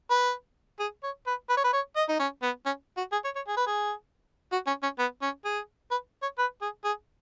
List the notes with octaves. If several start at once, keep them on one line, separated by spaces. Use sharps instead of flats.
B4
G#4
C#5
B4
B4
C#5
B4
C#5
D#5
D#4
C#4
B3
C#4
F#4
G#4
C#5
C#5
G#4
B4
G#4
F#4
C#4
C#4
B3
C#4
G#4
B4
C#5
B4
G#4
G#4